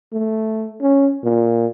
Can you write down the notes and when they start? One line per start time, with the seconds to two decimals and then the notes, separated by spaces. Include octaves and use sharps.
0.13 A3
0.81 C#4
1.24 A#2